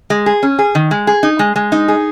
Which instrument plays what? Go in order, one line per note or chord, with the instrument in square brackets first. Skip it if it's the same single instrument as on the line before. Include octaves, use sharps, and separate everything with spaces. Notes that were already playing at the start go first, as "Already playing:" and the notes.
[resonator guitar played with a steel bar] G#3
G#4
C#4
G#4
D#3
G#3
G#4
D#4
G#3
G#3
D#4
G#4